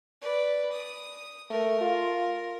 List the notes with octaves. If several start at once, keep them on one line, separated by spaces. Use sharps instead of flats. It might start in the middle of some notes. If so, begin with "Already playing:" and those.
B4 D5
D#6
A3 A#4
F4